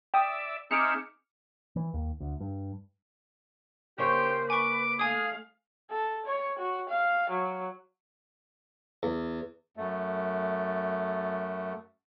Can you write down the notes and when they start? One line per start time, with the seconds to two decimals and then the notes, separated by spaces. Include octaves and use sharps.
0.14 D5 E5 G5 D#6
0.71 C4 D#4 G#4 E5 D6 F6 C#7
1.76 E3
1.94 D#2
2.20 D2
2.40 G2
3.98 C#3 A#3 G4 C5 C#5
4.50 B4 G#5 C#6 D6
4.99 A3 G#4 F5 G#5 D#6
5.90 A4
6.26 C#5
6.59 F#4
6.89 F5
7.30 F#3
9.03 E2
9.77 F#2 A3